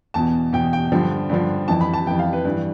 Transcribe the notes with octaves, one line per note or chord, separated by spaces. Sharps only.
E2 B2 A5
E2 B2 G5
G5
G2 D3 F3
G2 D3 F3
F2 E3 A5
B5
A5
F2 E3 G5
F5
B4
G2 E3